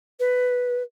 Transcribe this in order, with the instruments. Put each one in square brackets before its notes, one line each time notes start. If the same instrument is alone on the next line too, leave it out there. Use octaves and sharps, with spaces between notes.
[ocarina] B4